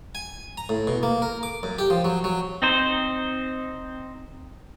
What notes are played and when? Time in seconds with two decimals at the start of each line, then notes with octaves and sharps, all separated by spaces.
0.15 G#5
0.57 A#5
0.69 A2
0.87 B2
1.03 A#3
1.22 A#4
1.43 D6
1.63 F#2
1.79 G4
1.90 F3
2.05 F#3
2.24 F#3
2.61 C4 D#4 C5